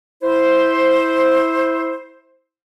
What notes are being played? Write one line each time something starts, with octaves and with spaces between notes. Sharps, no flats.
E4 C5